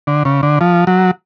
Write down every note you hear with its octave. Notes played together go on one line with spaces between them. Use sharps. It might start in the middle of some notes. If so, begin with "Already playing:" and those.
D3
C#3
D3
F3
F#3